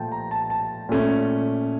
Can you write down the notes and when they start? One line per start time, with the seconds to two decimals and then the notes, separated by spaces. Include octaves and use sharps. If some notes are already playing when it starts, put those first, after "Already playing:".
Already playing: A#2 F3 A3 G5 A5
0.12 A#5
0.31 A5
0.50 A5
0.89 A#2 A3 C#4